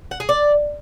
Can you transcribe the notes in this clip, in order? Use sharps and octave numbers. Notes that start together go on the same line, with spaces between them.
F#5
G#4
D5